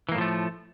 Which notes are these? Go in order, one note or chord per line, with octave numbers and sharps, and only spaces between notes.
A2 E3 F3 A3 A#3